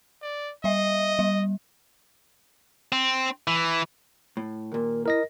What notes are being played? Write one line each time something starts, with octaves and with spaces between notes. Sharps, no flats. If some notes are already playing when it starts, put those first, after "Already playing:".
D5
G3 D#5 E5
G3
C4
E3
A2
D#2 A#2 A#4
E4 A#4 D#5 A#6